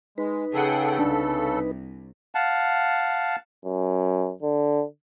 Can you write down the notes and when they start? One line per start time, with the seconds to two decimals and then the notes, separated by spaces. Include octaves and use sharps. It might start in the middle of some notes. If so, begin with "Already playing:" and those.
0.18 G#3 D#4 B4
0.54 C#3 G#4 A4 F#5 G5
0.99 C2 D4
2.35 F5 F#5 A5
3.65 F#2
4.42 D3